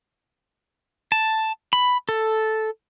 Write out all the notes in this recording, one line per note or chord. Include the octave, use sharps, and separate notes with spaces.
A5
B5
A4